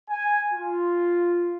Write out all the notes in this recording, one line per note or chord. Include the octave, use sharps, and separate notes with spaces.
G#5
F4